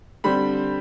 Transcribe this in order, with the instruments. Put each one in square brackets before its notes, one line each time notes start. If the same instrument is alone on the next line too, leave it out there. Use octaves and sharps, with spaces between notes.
[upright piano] D3 G3 C4 B5